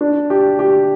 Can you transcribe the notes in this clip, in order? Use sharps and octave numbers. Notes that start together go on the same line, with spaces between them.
D4
G4
G4